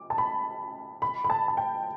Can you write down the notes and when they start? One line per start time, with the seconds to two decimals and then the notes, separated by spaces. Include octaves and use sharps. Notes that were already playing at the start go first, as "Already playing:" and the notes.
Already playing: D6
0.10 A5
0.18 B5
1.02 B5
1.24 B5
1.30 A5
1.48 A5
1.57 G5